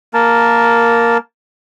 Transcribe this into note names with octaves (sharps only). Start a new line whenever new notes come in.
A#3 A#4 A5